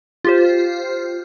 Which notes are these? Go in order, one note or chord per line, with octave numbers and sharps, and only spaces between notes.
F4 G4 C5